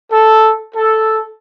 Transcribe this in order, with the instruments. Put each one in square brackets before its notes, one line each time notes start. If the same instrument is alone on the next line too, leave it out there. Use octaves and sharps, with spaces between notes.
[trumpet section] A4
A4